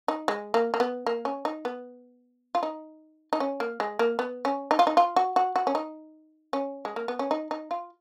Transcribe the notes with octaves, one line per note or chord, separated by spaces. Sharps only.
D#4
G#3
A#3
A#3
B3
A#3
C#4
D#4
B3
F4
D#4
D#4
C#4
A#3
G#3
A#3
B3
C#4
D#4
F4
D#4
F4
F#4
F#4
F#4
C#4
D#4
C#4
G#3
A#3
B3
C#4
D#4
D#4
F4